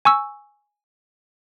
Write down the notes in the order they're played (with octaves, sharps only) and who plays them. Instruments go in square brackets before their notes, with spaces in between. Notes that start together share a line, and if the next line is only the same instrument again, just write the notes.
[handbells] G#5 C#6 E6